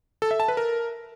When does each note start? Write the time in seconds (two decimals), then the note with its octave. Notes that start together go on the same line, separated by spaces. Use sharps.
0.22 A4
0.31 E5
0.40 A5
0.48 B4
0.57 A#4